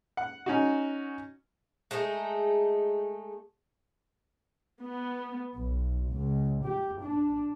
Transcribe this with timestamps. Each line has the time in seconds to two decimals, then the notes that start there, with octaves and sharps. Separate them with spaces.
0.17 F#5
0.46 C#4 D#4 F#4
1.91 G#3 A3 D#4 G#4
4.83 B3
5.56 B1
6.15 C#2
6.66 G4
7.02 D4